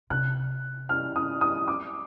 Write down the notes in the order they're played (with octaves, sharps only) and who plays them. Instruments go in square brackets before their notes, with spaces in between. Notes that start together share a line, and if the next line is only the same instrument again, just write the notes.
[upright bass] C3 [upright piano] F#6
[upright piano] F6
D#6
D#6
D6